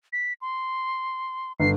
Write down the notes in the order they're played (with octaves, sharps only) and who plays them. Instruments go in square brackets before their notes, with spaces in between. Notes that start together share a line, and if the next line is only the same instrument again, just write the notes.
[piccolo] B6
C6
[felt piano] G1 [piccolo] C7